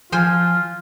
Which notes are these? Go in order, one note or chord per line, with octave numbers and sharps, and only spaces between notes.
F3 F4 C5 G5 G#5